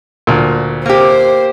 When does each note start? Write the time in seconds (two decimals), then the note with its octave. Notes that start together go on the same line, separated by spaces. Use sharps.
0.27 D2 A#2
0.86 A#3 G4 C5